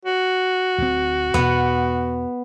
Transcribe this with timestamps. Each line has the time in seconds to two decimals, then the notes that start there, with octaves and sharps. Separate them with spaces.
0.05 F#4
0.78 D1 C4
1.34 E2 B2 B3